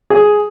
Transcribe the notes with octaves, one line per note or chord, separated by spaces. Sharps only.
G#4